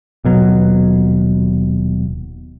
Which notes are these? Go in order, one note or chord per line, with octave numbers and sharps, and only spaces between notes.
D#1 B2 F#3